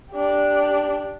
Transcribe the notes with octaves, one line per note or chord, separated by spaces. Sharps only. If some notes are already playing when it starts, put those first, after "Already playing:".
D4 G4